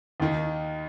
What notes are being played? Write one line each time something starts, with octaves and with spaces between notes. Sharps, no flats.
D#2 D#3